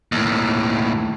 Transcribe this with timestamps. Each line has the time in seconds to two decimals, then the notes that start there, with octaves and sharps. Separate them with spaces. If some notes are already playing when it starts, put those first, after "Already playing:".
0.12 D#2 A2